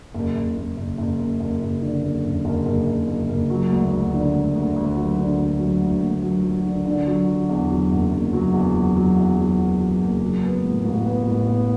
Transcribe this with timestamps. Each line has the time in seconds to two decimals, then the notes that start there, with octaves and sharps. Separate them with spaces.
0.14 F#1
0.36 F#1
0.56 F#1
0.77 F#1
0.98 F#1
1.20 F#1
1.40 F#1
1.61 F#1
1.82 D3
2.03 F#1
2.24 F#1
2.45 F#1
2.66 F#1
2.87 F#1
3.08 F#1
3.29 F#1
3.50 F#3
3.72 D2
3.92 D2
4.14 D3
4.34 D2
4.55 D2
4.76 D2
4.97 F#3
5.18 D3
5.39 D2
5.59 F#3
5.81 D2
6.02 D2
6.22 F#3
6.44 F#3
6.65 D3
6.85 D3
7.07 F#3
7.28 F#3
7.49 E2
7.70 F#3
7.91 F#1
8.12 F#1
8.33 F#3
8.54 E2
8.75 F#3
8.96 F#3
9.17 E2
9.38 F#3
9.59 F#3
9.80 F#3
10.01 F#1
10.22 F#3
10.43 B3
10.64 A2
10.84 A1
11.06 B3
11.27 A1
11.48 B3